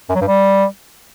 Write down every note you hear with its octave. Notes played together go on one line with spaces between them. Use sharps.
F#2
F#3
G2
G3